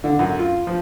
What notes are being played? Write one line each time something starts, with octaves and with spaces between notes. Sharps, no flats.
D3
F#2
F4
F3